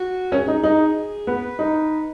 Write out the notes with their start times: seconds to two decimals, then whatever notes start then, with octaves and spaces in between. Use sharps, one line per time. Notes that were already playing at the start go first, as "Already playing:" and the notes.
Already playing: F#4
0.32 C#4 G#4
0.48 D#4
0.64 D#4
1.27 B3 B4
1.59 D#4